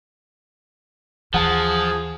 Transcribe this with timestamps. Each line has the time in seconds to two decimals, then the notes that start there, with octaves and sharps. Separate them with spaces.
1.34 D#2 E3 F3 G#4 F#5 A5